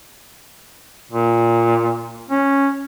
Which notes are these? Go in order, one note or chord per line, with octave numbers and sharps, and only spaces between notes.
A#2
C#4